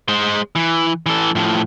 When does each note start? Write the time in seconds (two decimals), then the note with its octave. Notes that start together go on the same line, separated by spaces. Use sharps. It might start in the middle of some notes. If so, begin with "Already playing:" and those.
0.08 G#3 C5
0.56 E3
1.06 E3 A4
1.35 A2 F3